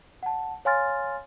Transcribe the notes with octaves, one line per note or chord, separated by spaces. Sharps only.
F#5 A5
C#5 F5 G#5 C6 F6 A6